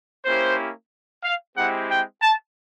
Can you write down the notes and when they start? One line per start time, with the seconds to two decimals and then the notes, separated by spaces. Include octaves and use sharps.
0.25 A#3 C#4 E4 G4 C5
1.24 F5
1.56 G#3 C4 E4 G4 F#5
1.90 G5
2.22 A5